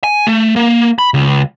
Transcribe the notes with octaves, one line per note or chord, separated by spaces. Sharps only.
G#5
A3
A#3
B5
C#2